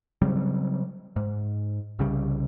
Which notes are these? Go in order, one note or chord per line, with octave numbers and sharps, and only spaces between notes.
C#3 F#3 G3 C4
G#2
C2 C#3 G3